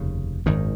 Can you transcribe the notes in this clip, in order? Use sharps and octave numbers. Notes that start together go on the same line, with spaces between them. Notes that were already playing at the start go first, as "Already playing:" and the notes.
Already playing: F1 D#2 C#3
G#1 F#2 D#3